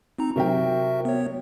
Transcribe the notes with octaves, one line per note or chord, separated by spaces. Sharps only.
C4 D#4 A#5
C3 F#3 F#4 A#4 E5 G5
B3 C#5